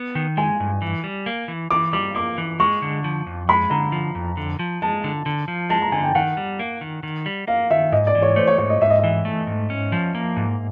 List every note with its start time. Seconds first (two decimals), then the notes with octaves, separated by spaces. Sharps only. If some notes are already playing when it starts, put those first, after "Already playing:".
Already playing: B3
0.15 D#3
0.37 G#3 G#5
0.60 G2
0.82 E3
1.04 G3
1.26 A#3
1.48 E3
1.71 E3 D6
1.93 G3 D6
2.15 A#3 D6
2.38 E3
2.60 G#3 C#6
2.82 D3
3.04 F3
3.26 F2
3.49 G#3 B5
3.70 D3 A#5
3.92 F3
4.15 F2
4.37 D3
4.59 F3
4.82 G#3 A5
5.04 D3
5.26 D3
5.48 F3
5.70 G#3 A5
5.82 A#5
5.92 D3 G#5
6.04 G5
6.15 D#3 F#5
6.37 G3
6.59 A#3
6.81 D#3
7.03 D#3
7.26 G3
7.47 A#3 F5
7.70 D#3 E5
7.92 G#2 D#5
8.07 D5
8.15 E3
8.22 C#5
8.36 A3 C5
8.47 C#5
8.58 G#2 C#5
8.70 D#5
8.81 G#2 E5
8.90 D#5
8.98 E5
9.04 E3
9.25 A3
9.47 G#2
9.70 C#4
9.92 F3
10.15 A#3
10.37 G#2